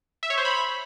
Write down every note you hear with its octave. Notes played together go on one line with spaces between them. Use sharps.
E5
C#5
C5
B5